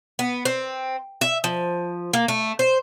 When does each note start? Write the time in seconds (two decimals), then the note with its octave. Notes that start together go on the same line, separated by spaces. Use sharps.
0.19 B3
0.45 C4
1.21 E5
1.44 F3
2.13 A#3
2.28 A3
2.59 C5